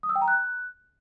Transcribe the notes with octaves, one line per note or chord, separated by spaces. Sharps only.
D#6
E6
G5
A#5
F#6